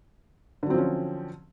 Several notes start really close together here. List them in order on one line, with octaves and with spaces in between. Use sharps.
D3 F#3 C4 F3 C#4